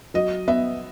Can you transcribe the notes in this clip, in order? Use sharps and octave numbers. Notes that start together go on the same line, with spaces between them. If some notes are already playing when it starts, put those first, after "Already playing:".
F#3 D#5
B3 E5